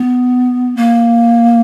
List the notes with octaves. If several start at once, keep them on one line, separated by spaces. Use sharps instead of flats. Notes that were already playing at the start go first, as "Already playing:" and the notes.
Already playing: B3
A#3